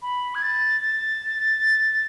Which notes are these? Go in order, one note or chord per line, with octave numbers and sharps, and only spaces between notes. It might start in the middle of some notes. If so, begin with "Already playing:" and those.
B5
G#6
A6
A6